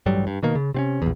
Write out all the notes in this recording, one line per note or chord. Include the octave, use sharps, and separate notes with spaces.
A1 G2 F#3 G3
G2
B2 D#3 A#3
C#3
C3 C4 C#4
A#1 E2